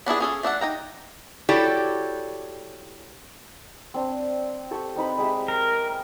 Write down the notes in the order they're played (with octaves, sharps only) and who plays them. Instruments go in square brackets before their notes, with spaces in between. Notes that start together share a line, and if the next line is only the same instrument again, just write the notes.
[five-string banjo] B3 D4 E4 G#4
C#4 G#4 A4
A3 D4 E5 F#5
D#4 G5 A#5
[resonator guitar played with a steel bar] E4 F#4 G4 A4 C#5 D5
[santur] C4 D4
G4 A4 C#6
C4 D#4 B4
G#3 G4 E5
[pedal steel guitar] A#4